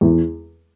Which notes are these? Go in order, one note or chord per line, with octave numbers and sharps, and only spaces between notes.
E2